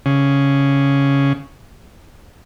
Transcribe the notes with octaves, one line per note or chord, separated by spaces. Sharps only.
C#3